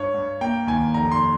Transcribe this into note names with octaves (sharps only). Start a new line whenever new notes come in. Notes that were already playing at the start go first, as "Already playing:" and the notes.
Already playing: G2 C#5
G2
A#3 G5
D#2 G#5
F1 A#5
C6